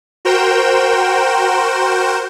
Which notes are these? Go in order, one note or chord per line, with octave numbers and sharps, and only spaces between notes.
F#4 A#4 C5 G5 E7